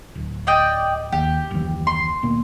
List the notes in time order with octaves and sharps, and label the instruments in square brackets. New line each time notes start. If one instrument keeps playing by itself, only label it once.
[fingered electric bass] D1
[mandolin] D5 D#5 G5
[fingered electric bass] D#2 [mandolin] G4
[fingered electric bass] F#1 D#2 E3
[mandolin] C6
[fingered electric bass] D#1 B2 A#3